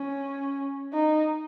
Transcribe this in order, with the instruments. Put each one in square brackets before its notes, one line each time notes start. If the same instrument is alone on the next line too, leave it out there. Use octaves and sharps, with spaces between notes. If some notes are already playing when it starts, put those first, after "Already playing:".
Already playing: [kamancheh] C#4
D#4